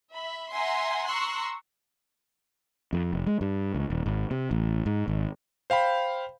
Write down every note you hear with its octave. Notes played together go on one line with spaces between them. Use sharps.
E5 B5
E5 F#5 G#5 A#5 C6
A#5 C6 C#6 E6 F#6
F2
F1
G#3
G2
C#2
D#1
G#1
C3
A1
G#2
G#1
C5 F5 G5 B5